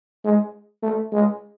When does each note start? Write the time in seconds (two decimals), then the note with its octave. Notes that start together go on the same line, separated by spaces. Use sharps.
0.25 G#3
0.83 A3
1.13 G#3